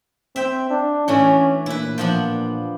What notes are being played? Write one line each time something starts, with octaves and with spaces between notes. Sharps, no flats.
C4 E5 G5
D4
A2 E3 C#4 D4
A#2 E4 B4
F3 B3 D4